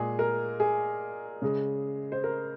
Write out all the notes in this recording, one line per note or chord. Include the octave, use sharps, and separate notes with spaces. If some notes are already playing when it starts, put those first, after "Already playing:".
Already playing: A#2 G#3 G#4
A#4
G#4
C#3 G#3
C5
A#4